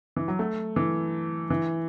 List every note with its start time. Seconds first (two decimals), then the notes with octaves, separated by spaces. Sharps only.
0.17 E3
0.28 F#3
0.39 A3
0.76 E3
1.50 E3